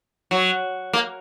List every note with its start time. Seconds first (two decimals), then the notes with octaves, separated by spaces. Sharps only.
0.31 F#3
0.93 A#3